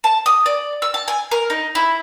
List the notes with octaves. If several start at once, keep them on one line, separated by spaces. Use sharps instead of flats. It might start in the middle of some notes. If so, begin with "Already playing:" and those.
A5
D#6
D5
E6
A5
G#5
A#4
D#4
E4